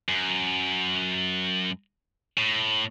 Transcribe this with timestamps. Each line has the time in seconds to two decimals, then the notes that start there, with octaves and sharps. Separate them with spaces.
0.09 F#2
2.38 A2